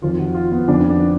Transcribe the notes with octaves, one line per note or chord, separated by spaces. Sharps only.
F2 D#3 F4
F#4
F4
B3
F2 D3 D4
D4